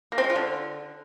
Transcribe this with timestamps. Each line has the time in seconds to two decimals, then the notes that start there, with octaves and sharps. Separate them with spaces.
0.12 A#3
0.18 C4
0.24 G#3
0.30 F4
0.36 D3